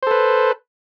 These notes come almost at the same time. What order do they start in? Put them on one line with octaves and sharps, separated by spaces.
C5 A4 B4